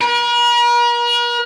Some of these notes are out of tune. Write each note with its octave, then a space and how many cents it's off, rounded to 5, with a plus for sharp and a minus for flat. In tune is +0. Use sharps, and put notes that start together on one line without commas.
A#4 +45